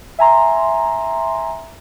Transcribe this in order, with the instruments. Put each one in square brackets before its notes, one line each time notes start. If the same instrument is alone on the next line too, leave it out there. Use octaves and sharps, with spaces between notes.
[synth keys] E5 G#5 A#5 C6